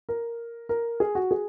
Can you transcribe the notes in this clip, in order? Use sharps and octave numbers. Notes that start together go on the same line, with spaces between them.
A#4
A#4
G#4
F#4
G#4